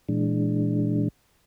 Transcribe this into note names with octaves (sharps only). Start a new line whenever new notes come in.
A#2 E3 G#3 D4